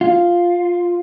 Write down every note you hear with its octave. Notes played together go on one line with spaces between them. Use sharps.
F4